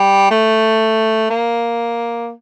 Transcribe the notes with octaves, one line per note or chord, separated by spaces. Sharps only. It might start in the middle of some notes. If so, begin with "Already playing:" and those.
Already playing: G3
A3
A#3